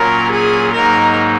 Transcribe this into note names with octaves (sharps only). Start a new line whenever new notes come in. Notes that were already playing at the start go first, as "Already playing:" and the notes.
Already playing: A#2 F#3 C#4 F4 A#4
G#4
G#2 F#3 A#3 D#4 A#4